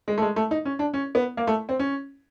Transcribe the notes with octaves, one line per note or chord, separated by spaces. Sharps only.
G#3
A3
G#3
A3
D#4
C#4
D4
C#4
B3
A#3
A3
C4
C#4